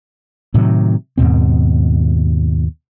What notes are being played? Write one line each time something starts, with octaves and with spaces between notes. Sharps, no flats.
A2 C3 D#3 F#3
D#2 G#2 B2 C4